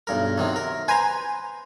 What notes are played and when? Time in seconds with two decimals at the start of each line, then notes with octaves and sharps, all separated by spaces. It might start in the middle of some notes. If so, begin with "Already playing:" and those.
0.07 B1 G2 A#4
0.38 C3 D#3 F#3
0.56 A#4
0.88 B4 C5 G#5 A#5